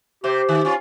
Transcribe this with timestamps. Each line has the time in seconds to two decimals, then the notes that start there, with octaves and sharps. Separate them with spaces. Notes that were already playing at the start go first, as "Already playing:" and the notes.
0.24 C3 G4 C5
0.49 D#3
0.65 C#4 F4